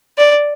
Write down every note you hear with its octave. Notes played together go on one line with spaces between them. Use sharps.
D5